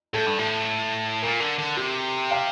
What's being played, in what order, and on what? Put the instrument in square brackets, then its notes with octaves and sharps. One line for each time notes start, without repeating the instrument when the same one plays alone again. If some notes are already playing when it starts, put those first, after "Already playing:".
[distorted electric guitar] A2 [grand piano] A4
[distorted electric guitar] G2
A2
[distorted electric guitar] A#2 [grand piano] A#4
[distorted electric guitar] D3
D3
[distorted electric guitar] C3 [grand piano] G4
[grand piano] F5